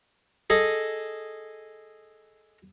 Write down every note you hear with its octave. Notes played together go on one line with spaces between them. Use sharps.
G#4 A4 D#5